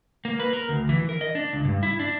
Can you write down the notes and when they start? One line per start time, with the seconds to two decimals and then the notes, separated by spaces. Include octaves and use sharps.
0.25 A#3
0.40 B4
0.53 A#4
0.69 D2
0.89 E3
1.09 A#4
1.21 D#5
1.35 D4
1.53 C#2
1.65 G2
1.83 E4
1.99 D4